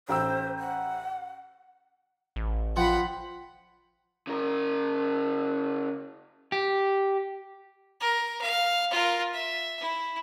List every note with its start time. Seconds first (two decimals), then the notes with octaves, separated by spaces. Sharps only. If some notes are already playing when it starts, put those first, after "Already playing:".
0.09 A1 C5 G5 E6
0.59 F#5
2.36 A1
2.76 F3 F#5 G5 B5 C6
4.27 C#3 A#4
6.52 G4
8.00 A#4
8.41 F5
8.91 F4 A#4
9.33 E5
9.81 E4